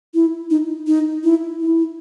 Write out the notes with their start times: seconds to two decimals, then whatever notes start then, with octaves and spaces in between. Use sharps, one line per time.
0.15 E4
0.50 D#4
0.87 D#4
1.24 E4
1.61 E4